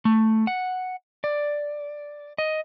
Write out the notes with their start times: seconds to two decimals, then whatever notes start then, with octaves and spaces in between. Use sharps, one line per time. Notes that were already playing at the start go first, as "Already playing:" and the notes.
0.05 A3
0.47 F#5
1.24 D5
2.38 D#5